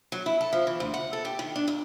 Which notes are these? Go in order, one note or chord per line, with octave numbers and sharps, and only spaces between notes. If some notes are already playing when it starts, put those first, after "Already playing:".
F#3
E4
A4
F3
E3
D2
F#5
A4
G4
D#3
D4
D#2